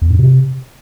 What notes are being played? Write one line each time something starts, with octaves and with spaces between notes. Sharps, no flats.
E2
G#2
C3